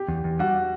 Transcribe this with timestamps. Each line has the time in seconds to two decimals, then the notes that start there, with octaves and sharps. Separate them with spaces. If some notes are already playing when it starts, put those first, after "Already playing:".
Already playing: G4
0.08 E2
0.24 E2
0.39 G3 F#4